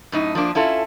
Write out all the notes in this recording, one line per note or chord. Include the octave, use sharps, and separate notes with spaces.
F#2 A2 D#4
F3 A#3 D4
C#4 E4 F4 A4